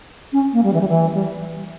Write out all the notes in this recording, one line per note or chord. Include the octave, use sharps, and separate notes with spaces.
C#4
A#3
G3
E3
G3
E3
G3